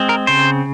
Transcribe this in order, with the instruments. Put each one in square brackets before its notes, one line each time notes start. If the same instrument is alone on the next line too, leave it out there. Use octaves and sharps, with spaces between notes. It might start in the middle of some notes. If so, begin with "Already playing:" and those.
Already playing: [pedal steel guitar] G#3 C4
A#4
C#3 C5